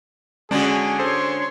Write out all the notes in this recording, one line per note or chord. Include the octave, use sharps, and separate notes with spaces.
D3 G#3 C#4 D4 F#4 G#4
A4 C5 C#5 C6